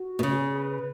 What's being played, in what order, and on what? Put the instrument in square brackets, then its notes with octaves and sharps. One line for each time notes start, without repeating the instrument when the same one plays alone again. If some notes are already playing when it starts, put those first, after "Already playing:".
Already playing: [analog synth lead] F#4
[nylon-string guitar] B2
[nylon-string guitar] C#3 [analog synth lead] G#4
[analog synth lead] B4
B4